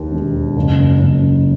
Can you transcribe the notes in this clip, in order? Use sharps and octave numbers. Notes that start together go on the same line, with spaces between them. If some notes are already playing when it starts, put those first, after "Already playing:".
Already playing: D#2
E1
F#1
F#1